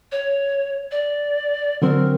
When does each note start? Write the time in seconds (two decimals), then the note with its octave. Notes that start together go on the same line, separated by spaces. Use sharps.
0.12 C#5
0.91 D5
1.82 D3 F#3 C4 A#4